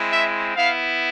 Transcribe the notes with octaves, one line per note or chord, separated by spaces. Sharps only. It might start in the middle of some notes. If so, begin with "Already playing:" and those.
Already playing: G#3 C4 E4
E5
B3 E4 F5